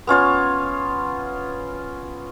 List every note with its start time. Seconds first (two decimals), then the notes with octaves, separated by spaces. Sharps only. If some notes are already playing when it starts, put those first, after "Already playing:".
0.07 B3 C#4 F4 C#5